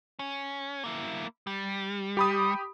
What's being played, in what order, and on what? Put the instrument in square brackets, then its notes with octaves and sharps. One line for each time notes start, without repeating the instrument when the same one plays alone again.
[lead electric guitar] C#4
A#3 E4
G3
[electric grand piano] G4 B5 D#6